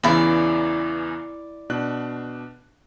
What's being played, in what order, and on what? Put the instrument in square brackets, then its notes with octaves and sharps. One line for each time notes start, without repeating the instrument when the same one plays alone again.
[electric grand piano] E2 C#3 E3 [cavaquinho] E4 D5
[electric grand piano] B2 D4 F#6